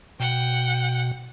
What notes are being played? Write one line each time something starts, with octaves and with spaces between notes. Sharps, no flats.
B2 F#5 G5